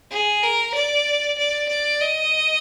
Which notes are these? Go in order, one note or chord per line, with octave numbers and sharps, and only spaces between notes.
G#4
A#4
D5
D5
D5
D#5